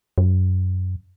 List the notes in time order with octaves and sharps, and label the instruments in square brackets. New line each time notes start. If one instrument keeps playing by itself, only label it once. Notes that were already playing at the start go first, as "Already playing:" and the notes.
[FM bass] F#2